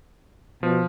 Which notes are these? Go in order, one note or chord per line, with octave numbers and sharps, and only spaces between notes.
B2 F3